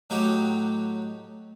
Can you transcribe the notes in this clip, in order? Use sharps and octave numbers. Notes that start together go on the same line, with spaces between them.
A2 F#3 D#4 F#4 G4